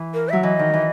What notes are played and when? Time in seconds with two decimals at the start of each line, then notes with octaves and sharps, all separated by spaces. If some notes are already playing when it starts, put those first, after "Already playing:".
Already playing: E3
0.14 A#4
0.29 F#3 E5
0.43 E3 D#5
0.59 D#3
0.73 E3